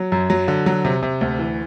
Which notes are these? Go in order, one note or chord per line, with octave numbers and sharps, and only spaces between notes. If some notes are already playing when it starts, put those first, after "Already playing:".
Already playing: F#3
F#2
F#3
D3
F#3
C3
C3
D2
E3